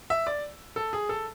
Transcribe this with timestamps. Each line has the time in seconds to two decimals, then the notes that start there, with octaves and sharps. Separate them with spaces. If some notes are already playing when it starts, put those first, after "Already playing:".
0.10 E5
0.27 D5
0.76 A4
0.93 G#4
1.09 A4